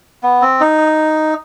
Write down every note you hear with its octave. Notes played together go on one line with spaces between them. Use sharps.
B3
C4
D#4